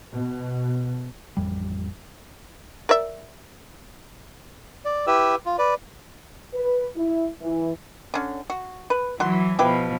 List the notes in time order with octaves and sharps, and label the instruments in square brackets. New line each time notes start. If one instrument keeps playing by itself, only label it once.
[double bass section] B2
[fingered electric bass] A1 F2 G3
[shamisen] A#4 D5 E5
[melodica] D5
E4 G4 B4 E6
F4
B4 D5
[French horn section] B4
E4
E3
[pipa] D3 C#4
F#4
B4
[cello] E3 F#3 [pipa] F#4 C6
[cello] B2 F3 [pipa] E4 G4 B4